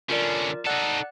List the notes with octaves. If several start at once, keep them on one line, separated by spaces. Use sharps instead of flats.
D3 C#4 F4 A#4 D5
D#4 A4 D5 F#5 F#6